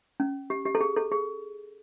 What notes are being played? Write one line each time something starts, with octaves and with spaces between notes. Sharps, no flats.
C#4
G4
G4
A4
G#4
A4
G#4